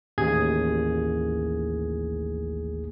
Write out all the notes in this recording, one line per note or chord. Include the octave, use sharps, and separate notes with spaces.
A1 D#2 G#4 G#6